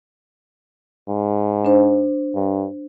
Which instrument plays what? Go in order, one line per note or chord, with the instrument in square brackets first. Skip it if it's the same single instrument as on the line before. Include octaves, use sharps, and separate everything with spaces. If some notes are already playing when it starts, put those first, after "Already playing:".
[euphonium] G#2
[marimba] D4 C5
[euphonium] G2